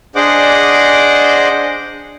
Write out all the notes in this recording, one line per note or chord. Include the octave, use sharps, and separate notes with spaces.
D4 G#4 C5 D#5 F#5 D6